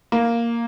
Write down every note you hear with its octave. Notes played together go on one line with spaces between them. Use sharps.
A#3